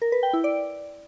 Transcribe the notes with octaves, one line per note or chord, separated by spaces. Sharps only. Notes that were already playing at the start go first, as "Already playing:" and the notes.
A#4
B4
G5
E4
D5